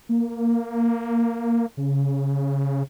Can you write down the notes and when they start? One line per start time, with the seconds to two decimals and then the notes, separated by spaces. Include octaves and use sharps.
0.09 A#3
1.77 C#3